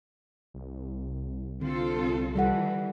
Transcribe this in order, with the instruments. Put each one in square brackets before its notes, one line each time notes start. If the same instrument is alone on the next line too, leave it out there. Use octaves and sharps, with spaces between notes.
[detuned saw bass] C2
[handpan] D3 [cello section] C4 F4 A4
[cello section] E3 [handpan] G3 A4 F#5